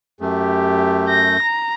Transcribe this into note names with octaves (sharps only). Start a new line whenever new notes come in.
F#2 A3 G4
G6 A#6
A#5